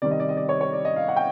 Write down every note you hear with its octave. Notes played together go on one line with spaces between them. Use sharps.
C3 D#3 G3 D5
D#5
D5
D#5
D5
C#5
C#5
D5
D#5
F5
F#5
G5